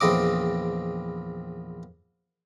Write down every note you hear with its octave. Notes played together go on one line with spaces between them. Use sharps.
A#1 E2 C4 D#5 D6